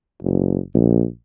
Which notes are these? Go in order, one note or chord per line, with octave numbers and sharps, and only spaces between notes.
F#1
A#1